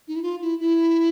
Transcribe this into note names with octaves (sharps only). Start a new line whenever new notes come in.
D#4
E4
F4
E4
E4